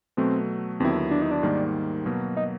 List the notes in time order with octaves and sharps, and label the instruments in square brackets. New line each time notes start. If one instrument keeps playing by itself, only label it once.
[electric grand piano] B2 F#3 A3 [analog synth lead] C4
[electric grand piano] D#2 D3 F#3 B3 E4 [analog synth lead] C4
[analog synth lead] D4
D#4
D4
[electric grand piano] G#2 D#3 G3 A#3
B2 F#3 A#3
[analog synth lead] D#4